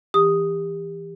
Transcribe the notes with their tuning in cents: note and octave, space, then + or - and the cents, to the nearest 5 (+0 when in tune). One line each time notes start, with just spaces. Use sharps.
E3 +0 G4 +30 D#6 +0